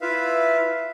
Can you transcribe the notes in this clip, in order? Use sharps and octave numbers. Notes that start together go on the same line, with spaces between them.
E4 F4 B4 E5 F5